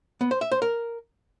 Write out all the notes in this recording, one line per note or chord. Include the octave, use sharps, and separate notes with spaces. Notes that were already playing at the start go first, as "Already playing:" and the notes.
B3
C5
E5
C5
A#4